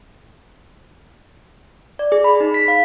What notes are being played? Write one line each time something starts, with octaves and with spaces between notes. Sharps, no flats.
D5
G#4
B5
D#4
B6
F5